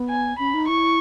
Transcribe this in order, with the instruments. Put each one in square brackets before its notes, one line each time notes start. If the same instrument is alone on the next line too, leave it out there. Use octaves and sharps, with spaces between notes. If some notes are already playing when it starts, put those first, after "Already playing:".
Already playing: [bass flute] B3
[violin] G#5
[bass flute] C#4 [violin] B5
[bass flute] D#4
[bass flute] E4 [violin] C#6